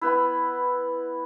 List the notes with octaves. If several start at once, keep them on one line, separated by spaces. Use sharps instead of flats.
B3 E4